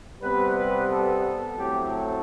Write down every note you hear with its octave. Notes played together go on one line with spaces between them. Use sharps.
C3 G3 B3 B4
B4
A4
A2 F#3 A3 C4 G4
A4